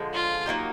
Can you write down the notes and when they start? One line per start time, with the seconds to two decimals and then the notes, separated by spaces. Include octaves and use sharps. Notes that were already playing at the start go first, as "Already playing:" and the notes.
Already playing: D3 F3 G#3
0.13 F4
0.46 F#3 A#3 D#4 G4